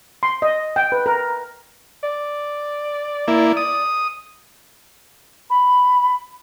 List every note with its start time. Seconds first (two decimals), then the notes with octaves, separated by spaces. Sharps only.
0.23 C6
0.42 D#5
0.76 G5
0.92 B4
1.06 A#4
2.04 D5
3.28 A#3 E4
3.57 D#6
5.50 B5